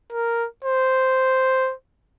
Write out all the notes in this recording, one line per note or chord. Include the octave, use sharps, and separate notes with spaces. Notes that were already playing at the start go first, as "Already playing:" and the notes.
A#4
C5